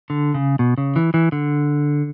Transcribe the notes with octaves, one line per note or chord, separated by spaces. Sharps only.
D3
C#3
B2
C#3
E3
E3
D3